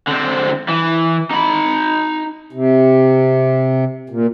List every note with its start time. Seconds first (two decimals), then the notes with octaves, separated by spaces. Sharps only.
0.07 D3 C4
0.68 E3
1.31 D#4 B5
2.53 C3
4.10 A#2